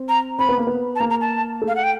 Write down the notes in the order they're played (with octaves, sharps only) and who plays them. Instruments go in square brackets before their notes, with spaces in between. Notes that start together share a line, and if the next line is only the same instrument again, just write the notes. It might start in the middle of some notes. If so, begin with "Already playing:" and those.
Already playing: [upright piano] C4
[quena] A#5
[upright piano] C4 [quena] B5
[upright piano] B3
A#3
B3
[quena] A5
[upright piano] A#3 [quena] A#5
[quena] A#5
A5
[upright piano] A3
[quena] F5
F#5
G5